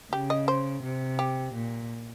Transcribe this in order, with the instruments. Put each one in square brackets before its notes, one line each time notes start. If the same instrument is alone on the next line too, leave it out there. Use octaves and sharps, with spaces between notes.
[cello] C#3 [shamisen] G4
[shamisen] D#5
C5
[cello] C3
[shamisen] G4
[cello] A#2